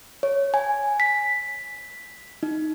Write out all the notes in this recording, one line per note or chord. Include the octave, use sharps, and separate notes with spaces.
C#5
G#5
B6
D#4